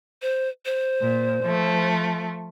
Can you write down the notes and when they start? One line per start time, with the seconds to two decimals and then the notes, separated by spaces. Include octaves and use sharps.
0.22 C5
0.65 C5
1.01 A#2
1.43 F3 A3